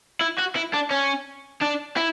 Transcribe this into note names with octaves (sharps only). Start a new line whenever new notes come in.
E4
F#4
E4
D4
C#4
D4
E4